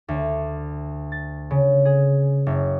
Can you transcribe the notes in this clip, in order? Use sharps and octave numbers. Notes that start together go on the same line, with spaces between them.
D2
A6
C#3
G#4
F#1